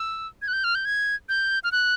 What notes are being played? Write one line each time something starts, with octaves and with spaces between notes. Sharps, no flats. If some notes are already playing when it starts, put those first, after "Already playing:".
Already playing: E6
G#6
F#6
G6
F6
G6
G#6
G6
F6
F#6